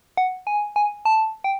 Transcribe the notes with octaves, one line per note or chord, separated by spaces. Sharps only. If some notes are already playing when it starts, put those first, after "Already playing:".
F#5
G#5
G#5
A5
G5